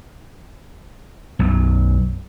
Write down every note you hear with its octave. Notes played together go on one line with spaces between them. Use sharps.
B1 F#2